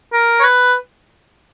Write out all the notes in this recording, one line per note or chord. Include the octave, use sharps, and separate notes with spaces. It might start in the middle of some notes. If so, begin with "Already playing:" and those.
A#4
C#5
B4